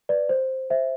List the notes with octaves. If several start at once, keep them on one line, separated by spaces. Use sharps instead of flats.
B4 D5
C5
C5 E5